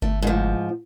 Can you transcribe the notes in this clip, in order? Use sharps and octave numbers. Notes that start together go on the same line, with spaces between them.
G1 A3
G#2 F3